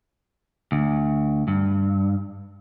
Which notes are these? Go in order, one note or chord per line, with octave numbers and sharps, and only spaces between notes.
D2
G2